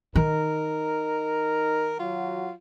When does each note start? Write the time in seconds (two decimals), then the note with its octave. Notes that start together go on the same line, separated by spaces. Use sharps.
0.15 D#3 D#4 A#4
2.00 F#3 F4 F#4